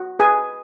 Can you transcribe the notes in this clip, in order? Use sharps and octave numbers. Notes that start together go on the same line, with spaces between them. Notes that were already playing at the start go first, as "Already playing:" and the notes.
Already playing: F#4
G#4 B4 G#5